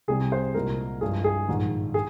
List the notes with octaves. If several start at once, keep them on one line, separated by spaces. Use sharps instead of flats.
C2 C3 G3 G#4
C5
C2 A#2 G#3 A#4
G2 F3 G#3 G#4
G#4
A#1 G#2 D#3
G#4